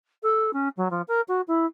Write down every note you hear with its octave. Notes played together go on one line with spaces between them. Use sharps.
A4
C#4
F#3
F3
A#4
F#4
E4